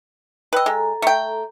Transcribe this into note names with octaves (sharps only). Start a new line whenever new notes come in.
B4 D#5 G5 E6
G#3 A4 A#5
A3 G5